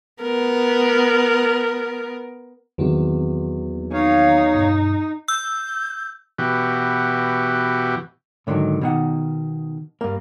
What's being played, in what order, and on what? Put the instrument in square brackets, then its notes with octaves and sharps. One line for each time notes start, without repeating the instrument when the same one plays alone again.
[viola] B3 A#4
[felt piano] E2 F#3 [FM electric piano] D#3 A#3 C4
[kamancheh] D#4 [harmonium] C#5 F5
[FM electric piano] G2 B2
[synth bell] E6 [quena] G6
[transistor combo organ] B2 E3 F#4 G4
[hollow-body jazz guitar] G#2 D3 D#3 F3 F#3
B2 D#3 F#5
G2 A#3